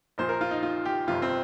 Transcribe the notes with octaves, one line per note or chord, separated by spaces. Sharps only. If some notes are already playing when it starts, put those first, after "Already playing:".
A#1 A#2 F3 C5
A#4
F4
D#4
F4
G4
G1 F2 C3 G3 F4
C4